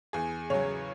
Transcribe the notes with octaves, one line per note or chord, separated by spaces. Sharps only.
E2 G#4
C#3 F#3 C#5